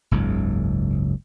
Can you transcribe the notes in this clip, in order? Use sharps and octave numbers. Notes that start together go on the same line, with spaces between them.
F#1 C#2 G#2